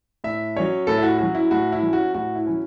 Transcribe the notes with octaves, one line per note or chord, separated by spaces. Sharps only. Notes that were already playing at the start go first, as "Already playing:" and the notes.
A2 E5
F#3 C#4 C#5
A2 A4
E4
F#4
F#3 C#4 F#4
E4
A2 F#4
E4
F#3 C#4
F#4
A2 F#4
E4
F#3 C#4